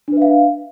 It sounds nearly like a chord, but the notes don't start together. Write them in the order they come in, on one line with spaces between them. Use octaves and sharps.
D4 B4 E5 F5